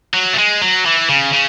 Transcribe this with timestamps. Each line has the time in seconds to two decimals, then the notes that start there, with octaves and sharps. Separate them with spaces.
0.14 F#3
0.33 A3
0.38 G#3
0.61 F#3
0.86 E3
1.10 C#3
1.33 C#3